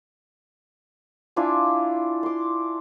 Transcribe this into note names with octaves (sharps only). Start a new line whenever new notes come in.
D4 E4 F4 G#5
C6 D6